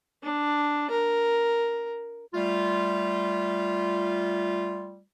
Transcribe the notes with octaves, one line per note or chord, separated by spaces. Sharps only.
D4
A#4
G3 A3 F4